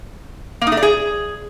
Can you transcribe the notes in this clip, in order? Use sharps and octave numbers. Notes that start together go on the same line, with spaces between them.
A#3
D#4
A3
D5
G#4